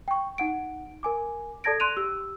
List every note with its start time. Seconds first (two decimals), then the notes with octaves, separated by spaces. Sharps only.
0.08 G5 C#6
0.38 D#4 F#5 D7
1.03 A#4 G#5 D6
1.64 A4 D5 A5 G#6 A#6 D7
1.80 C6 F#6 D7 D#7 F7
1.97 G4 E6